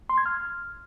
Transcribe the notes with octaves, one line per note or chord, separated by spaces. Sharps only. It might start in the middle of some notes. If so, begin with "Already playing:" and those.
C6
G#6
F6